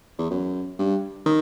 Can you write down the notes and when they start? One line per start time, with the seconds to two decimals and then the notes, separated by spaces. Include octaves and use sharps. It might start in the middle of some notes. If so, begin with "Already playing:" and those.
0.19 E2
0.31 F#2
0.79 G2
1.26 D#3